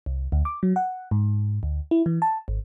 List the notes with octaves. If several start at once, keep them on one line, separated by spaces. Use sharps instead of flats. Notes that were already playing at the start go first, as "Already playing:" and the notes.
C2
D2
D6
F#3
F#5
G#2
D2
E4
E3
A5
G#1